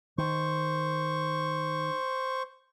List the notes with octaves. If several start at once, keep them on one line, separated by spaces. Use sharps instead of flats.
D#3 C5 C#6